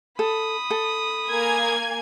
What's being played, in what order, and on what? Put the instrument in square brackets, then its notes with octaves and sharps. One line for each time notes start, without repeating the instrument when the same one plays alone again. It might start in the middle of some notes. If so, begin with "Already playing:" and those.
[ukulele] A4 [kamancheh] B5 D#6
[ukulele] A4
[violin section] A#3 G#5 G#6